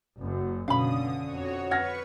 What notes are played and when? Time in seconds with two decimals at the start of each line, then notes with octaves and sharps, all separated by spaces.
0.18 F#1 F#2
0.68 B2 D3 C#4 F5 B5 D#6
1.24 F2 F#4 C#5
1.71 B4 F#5 C#6 F6 G#6 A#6